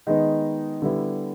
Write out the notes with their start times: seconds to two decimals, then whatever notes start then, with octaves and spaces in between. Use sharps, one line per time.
0.07 D#3 G#3 B3 D#4
0.82 D3 G3 B3 E4